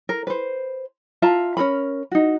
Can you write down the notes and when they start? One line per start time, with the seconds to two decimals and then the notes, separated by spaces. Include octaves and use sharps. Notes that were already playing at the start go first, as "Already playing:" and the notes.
0.09 A#4
0.27 B4 C5
1.22 F4 E5 A5 A#5
1.57 C#4 G#4 A#4 B5
2.11 D#4 F#4